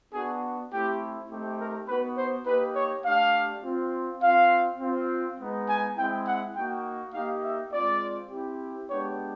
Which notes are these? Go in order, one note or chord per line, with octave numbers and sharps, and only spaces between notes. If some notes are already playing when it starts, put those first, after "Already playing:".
B3 D4 F#4 G#4
A3 C4 E4 G4
A3 C4 D#4 G4
A#4
B3 D#4 F#4 B4
C5
A#3 D#4 G4 B4
C#5
A3 D4 G4 F5
C4 F4
C4 F4 F5
C4 F4
G#3 B3 D#4
G#5
G#3 C4 E4 G5
F#5
A#3 D#4 F#4 G5
A#3 D#4 G4 F5
E5
G#3 C4 F4 D5
C4 E4 G4
G#3 B3 D4 G4 C#5